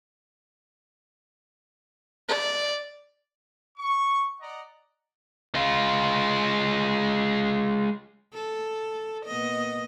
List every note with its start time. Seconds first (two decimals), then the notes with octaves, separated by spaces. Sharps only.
2.28 D5
3.78 C#6
4.41 D5 D#5 F#5 A#5
5.55 G#3 F4
8.34 A4
9.26 A#2 B3 D#5